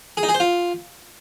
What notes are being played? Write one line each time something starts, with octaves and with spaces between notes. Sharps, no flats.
G#4
D#4
G#4
C5
F4